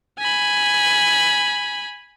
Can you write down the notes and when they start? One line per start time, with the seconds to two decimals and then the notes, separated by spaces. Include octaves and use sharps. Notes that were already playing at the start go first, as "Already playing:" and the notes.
0.19 G#5 B5